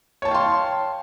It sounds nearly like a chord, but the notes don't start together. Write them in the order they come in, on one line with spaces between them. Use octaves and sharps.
C#5 A5 G5 F5 C6